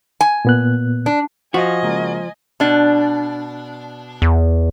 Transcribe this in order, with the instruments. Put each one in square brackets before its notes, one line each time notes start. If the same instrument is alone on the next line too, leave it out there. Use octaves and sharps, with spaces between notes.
[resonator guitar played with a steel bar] G#5
[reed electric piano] A#2 B3 F#6
[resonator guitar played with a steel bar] D4
[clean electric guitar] F3 [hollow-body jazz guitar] F#4 [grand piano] C5 F5 B6 [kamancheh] D#5 G#5
[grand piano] C#3 G#3 A#3
[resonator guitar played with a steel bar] B2 D4
[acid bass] E2